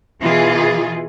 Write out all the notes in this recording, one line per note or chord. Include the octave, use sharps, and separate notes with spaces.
B2 E3 F4 G#4